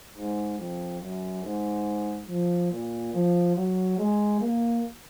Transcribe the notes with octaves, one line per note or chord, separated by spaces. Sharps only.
G#2
F2
F#2
G#2
F3
A#2
F3
F#3
G#3
A#3